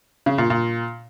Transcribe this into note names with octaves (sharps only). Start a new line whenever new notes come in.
C#3
A#2
A#2